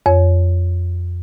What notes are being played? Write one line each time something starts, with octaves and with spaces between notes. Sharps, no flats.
F2 C#5